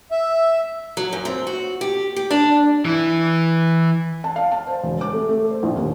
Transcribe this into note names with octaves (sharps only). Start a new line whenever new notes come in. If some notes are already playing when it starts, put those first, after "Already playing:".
E5
F#3
F#2
C4
F#4
G4
G4
D4
E3 E4
A5
F5
A5
C5
E1
D6
A3
A3
C5
A#1
D#2